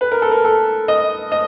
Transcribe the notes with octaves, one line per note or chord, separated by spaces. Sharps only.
B4
A#4
A4
A#4
A4
D#5
D#5